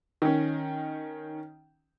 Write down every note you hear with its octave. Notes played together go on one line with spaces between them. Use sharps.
D#3 C#4